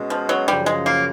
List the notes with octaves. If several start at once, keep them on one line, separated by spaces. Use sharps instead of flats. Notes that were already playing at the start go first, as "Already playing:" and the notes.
Already playing: B2 G#3 C#4
F3
F#3
F#2 C#3 F3 G3
G#3
A#3